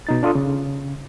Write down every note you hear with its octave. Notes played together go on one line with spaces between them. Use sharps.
B2 D#4 A6
D4 F4 A4 D#6
C#3